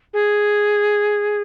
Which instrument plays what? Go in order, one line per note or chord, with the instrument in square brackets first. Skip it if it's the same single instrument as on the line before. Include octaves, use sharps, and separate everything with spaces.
[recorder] G#4